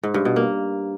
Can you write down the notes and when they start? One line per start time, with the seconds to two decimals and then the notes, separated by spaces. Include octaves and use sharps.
0.03 G#2
0.14 G2
0.25 B2
0.36 A#3